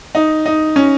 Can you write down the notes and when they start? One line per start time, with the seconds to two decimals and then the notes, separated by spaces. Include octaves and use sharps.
0.15 D#4
0.46 D#4
0.76 C#4